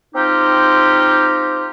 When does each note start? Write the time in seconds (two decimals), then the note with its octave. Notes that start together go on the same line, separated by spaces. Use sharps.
0.15 C4 D#4 F4 G4